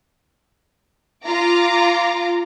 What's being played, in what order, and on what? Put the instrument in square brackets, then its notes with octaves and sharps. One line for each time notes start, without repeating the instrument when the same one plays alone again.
[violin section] F4 A#5 D6